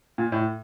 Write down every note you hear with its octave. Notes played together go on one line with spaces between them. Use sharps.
A#2
A2